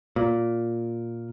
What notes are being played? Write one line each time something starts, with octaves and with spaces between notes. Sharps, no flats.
A#2